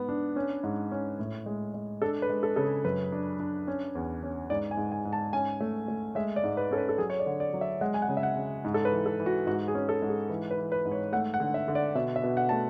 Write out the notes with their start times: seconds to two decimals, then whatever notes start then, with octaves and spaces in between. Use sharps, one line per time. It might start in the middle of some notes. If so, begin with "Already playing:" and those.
Already playing: G#2 B3
0.09 D4
0.36 C#4
0.63 G#2
0.91 C#4
1.19 A2
1.46 G#3
1.74 G#3
2.02 D4 A4
2.22 B4
2.29 G#3
2.43 A4
2.56 C#3 A4
2.64 G#4
2.84 F#2 B4
3.12 D4
3.40 D4
3.67 C#4
3.95 E2
4.23 C#4
4.50 G#2 D5
4.71 G#5
4.77 G#2
4.92 G#5
5.05 G#2
5.13 A5
5.33 C#4 G#5
5.61 A3
5.88 A3
6.15 G#3 E5
6.36 D5
6.44 G#2
6.57 B4
6.71 C#4 A4
6.78 B4
6.89 A4
6.98 F#3 G#4
7.10 C#5
7.20 D5
7.26 D3
7.40 D5
7.54 F#3
7.61 E5
7.81 G#3 F#5
7.94 G#5
8.02 F#5
8.09 C#3
8.17 E5
8.23 F#5
8.36 C#3
8.65 G#2
8.74 A4
8.85 B4
8.92 E3
9.06 A4
9.20 E3
9.26 F#4
9.47 G#2 F#4
9.68 G#4
9.75 C#4
9.89 A4
10.02 G#2
10.09 G#4
10.29 E3
10.51 B4
10.58 E3
10.72 B4
10.85 G#2
10.91 C#5
11.12 A3 F#5
11.34 F#5
11.40 D3
11.54 E5
11.68 D3
11.75 D5
11.95 B2 E5
12.16 E5
12.24 B2
12.37 F#5
12.49 A3 A5